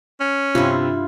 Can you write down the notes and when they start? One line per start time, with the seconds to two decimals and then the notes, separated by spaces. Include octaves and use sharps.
0.20 C#4
0.55 G2 C3 E4 F4